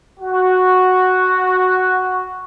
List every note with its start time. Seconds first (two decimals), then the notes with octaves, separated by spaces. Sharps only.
0.20 F#4